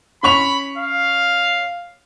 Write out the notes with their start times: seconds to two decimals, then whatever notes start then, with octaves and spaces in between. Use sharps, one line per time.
0.23 C#4 B5 C#6 F7
0.78 F5